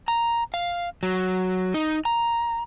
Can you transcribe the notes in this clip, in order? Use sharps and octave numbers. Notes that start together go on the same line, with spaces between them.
A#5
F5
F#3
D#4
A#5